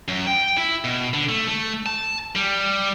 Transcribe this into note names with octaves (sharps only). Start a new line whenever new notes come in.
F#2
G5
E4
B2
D3
A3
A3
A5
G3